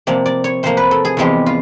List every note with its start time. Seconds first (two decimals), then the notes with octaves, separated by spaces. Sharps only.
0.07 C3 F3 A#3 D5
0.26 D5
0.44 C#5
0.63 C3 F3 A#3 C5
0.77 B4
0.91 A4
1.05 G#4
1.17 E2 C3 F3 G#3 G4
1.46 F4